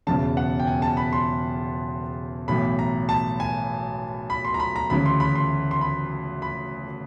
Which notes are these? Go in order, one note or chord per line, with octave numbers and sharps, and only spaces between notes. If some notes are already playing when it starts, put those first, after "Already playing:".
E1 E2 C#3 A5
F#5
G5
G#5
A5
B5
C6
B1 A2 E3 B5
A#5
A5
G#5
B5
C6
A#5
B5
A#5
D2 C#3 E3 B5
C6
B5
C6
C6
B5
B5